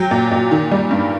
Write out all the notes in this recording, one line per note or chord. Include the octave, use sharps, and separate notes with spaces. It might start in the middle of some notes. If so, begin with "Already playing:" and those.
Already playing: F#3 G5
A#2
A#2
D#3
G3
G2